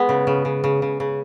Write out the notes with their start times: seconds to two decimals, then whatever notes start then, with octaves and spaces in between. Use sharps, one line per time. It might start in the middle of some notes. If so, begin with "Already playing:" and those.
Already playing: G#3 B3
0.09 C#3
0.27 C#3
0.45 C#3
0.64 C#3
0.82 C#3
1.00 C#3